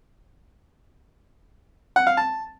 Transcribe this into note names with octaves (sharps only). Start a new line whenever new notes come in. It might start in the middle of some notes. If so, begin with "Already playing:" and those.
F#5
F5
A5